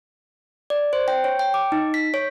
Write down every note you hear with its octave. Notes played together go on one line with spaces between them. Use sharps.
D5
C5
G5
C#5
G5
D6
D#4
B6
C#5